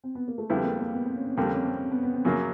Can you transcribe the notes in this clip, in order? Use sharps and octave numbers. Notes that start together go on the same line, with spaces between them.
C4
B3
A#3
A3
F2 D3 G3 G#3 B3 E4
A#3
A#3
B3
C4
C#4
C#4
F2 D3 G3 A#3 C4
C#4
C4
C4
B3
B3
C4
F#2 C#3 F#3 A#3 C#4